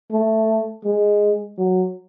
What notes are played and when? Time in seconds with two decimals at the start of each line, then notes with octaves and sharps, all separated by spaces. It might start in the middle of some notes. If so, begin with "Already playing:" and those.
0.11 A3
0.84 G#3
1.58 F#3